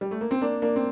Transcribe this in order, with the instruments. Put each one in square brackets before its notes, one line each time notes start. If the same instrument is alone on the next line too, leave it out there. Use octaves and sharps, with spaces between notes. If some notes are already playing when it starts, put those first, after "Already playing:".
[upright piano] G3
A3
A#3
C4
A#3 D4
A#3 D4
C4